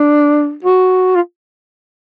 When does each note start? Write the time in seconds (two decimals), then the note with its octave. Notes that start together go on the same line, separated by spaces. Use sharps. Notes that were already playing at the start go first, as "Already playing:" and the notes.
Already playing: D4
0.64 F#4
1.15 F4